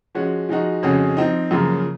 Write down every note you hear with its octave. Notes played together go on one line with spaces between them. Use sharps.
F3 G#3 C#4 F#4
F3 G#3 D#4 F#4
F2 C#3 G#3 C#4 F#4
F3 C4 D#4
F#2 C#3 F3 A#3